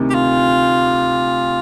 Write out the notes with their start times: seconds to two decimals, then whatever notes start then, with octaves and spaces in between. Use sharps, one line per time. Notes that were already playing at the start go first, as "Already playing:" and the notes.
Already playing: D2 C3 D#3
0.10 G4
0.15 F4